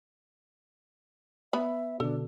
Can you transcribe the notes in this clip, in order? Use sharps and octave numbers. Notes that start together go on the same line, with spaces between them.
B3 E5 B5
B2 D3 D4 A4